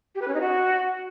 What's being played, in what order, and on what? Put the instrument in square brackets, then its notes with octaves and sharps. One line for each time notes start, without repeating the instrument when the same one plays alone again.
[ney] G4
B4
C#4
D#4
F#4